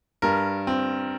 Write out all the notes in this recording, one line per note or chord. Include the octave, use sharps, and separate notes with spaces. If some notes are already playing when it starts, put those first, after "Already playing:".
G2 G3 A#4
C4